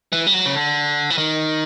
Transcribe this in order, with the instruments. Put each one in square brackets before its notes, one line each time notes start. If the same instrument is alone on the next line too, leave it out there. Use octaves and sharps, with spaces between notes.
[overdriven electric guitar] E3
G3
F#3
C#3
D3
E3
D#3